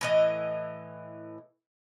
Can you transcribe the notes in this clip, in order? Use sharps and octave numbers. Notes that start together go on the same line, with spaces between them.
A2 E3 D#5